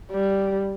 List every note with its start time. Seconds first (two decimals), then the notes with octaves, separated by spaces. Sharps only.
0.12 G3